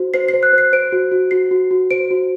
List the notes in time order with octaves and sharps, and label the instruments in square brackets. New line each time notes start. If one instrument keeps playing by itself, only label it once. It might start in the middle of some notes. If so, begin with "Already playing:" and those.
Already playing: [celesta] F#4 C5
C5 C7
C5 C7
F#6
C5
C7
C5 D7
F#4
F#4
F#4 C7
F#4
F#4
C5 D7
F#4